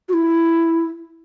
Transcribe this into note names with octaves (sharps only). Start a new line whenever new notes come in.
F#4
E4